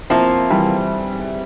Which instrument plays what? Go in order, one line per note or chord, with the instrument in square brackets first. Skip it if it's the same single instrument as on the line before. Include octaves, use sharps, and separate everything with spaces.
[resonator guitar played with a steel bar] F3 A#3 F4 [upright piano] C4 E4
[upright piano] E3 G3